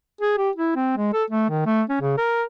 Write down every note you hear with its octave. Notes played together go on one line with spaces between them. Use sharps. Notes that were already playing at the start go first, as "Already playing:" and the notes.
G#4
G4
E4
C4
G#3
A4
A3
D#3
A3
C#4
C#3
A#4